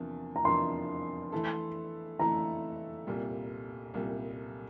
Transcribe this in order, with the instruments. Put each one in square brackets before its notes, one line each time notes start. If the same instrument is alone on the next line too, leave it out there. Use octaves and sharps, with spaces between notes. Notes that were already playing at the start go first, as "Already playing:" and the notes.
Already playing: [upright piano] E2 C3 F3 A#3 D4
[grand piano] A#5
[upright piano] E2 C3 F3 A#3 D4 [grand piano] C6
[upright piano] E3 A3 E4 A4
[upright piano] E3 A3 E4 A4 [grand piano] A#5
[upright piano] C2 A#2 G3
C2 A#2 G3